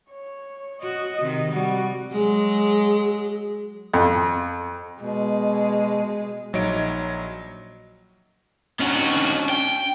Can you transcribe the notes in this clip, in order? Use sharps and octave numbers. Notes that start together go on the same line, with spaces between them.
C#5
F#4 D#5
C3 D#3
G3 F#4
F#3 G#3 G#4
F2
B2 G#3
A#1 F#3 D#4 C#5 D#5 D7
D#3 C#4 D4 F#4
G5